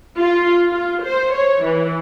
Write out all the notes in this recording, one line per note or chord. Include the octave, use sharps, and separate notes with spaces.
F4
F4
C5
C#5
E3